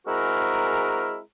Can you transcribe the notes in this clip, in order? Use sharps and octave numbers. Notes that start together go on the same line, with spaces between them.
G#3 C4 E4 F#4 G#4 A#4